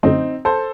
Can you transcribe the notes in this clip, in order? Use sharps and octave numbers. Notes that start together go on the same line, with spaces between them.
F#2 D3 F#3 A3 C4 D#4
A4 C5